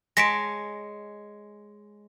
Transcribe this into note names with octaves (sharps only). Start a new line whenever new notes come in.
G#3 C#5 A5 A#6 B6 D7